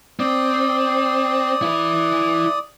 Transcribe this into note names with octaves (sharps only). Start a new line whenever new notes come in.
C4 D5 D#6
E4 B4